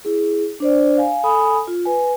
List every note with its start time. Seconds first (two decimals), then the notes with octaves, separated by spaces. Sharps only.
0.05 E4 G#4
0.60 D4 C5 D5
0.97 F5 G#5
1.24 A4 G#5 B5 D#6
1.67 F4
1.86 B4 G#5